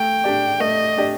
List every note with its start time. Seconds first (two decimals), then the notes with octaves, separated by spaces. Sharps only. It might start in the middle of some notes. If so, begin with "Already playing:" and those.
Already playing: A3 G5
0.24 D4 G4 D5
0.60 A3 D#5
0.97 D4 G4 D5